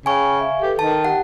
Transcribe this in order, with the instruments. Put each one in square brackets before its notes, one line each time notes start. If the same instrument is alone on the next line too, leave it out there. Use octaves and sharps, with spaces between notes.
[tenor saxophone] C#3 [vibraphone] G5 [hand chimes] G#5 C#6
[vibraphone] E5 F5
[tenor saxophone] G4 [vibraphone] A4 B4
[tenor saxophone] D#3 [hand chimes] A5
[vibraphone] G4 G5 [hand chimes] F#5